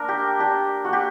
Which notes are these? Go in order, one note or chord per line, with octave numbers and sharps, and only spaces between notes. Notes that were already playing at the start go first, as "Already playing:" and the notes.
Already playing: A#3 D4 A#4
G4
D4 G4
A#3 F#4
G4